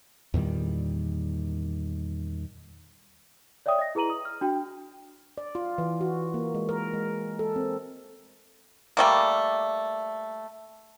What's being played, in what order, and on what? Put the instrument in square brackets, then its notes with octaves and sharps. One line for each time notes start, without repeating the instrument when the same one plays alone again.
[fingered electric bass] E2 A#2 D#3 G3
[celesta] C#5 D5 E5 G5 D#6
D#5 A#6
E4 G#4 B4 A#5 D#7 F#7
D#6
F6
D4 F#4 G5
[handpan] D5
F4
E3
F#4
A#3
G#3
A#4
G#3
A4
C4
[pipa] G3 A3 A#3